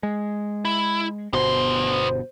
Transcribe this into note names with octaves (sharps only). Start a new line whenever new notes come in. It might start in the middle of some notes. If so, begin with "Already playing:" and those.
G#3
E4
G1 B2 B3 C5 C6